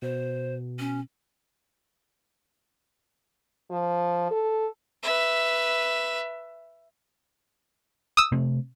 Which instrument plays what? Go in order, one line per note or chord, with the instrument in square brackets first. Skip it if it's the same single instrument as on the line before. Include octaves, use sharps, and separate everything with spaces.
[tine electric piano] B2 [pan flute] C5
[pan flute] C#4
[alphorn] F3
A4
[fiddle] B4 E5
[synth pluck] D#6 E6
[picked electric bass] C3 A3 C4